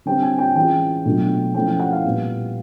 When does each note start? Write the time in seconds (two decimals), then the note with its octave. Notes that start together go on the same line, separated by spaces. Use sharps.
0.06 D3 G3 C4 G5
0.22 G#5
0.39 G5
0.56 E3 G#3 C#4 F4 G5
1.05 B2 F#3 A3 D4 F4
1.54 F3 A3 C#4 E4 G5
1.68 G5
1.79 F#5
1.92 F5
2.04 A#2 G3 B3